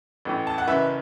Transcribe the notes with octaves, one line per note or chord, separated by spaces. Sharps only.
A1 A2 E3
A5
F#5
F#1 F#2 E3 B4 E5